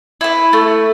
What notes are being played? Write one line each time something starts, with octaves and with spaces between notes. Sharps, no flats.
E4 B4
A3